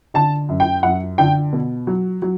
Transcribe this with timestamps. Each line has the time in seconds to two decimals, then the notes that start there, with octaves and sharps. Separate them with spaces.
0.14 D3 A5
0.49 F#2
0.60 G5
0.83 F#2 F#5
1.18 D3 G5
1.53 B2
1.87 F#3
2.22 F#3